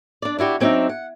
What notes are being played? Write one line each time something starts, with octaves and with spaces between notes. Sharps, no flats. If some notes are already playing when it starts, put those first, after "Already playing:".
D4 D5
D4 E4 F#4 G4
F#3 C4 D4 D#4 E5
F#5